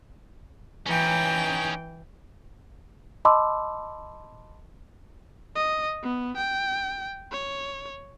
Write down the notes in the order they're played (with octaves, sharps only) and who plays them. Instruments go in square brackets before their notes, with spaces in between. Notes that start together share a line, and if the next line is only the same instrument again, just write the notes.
[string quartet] E3 G5 [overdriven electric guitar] C#4 D#4
[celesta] D#5 A5 B5 C6 D6 E6
[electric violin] D#5
B3
G5
C#5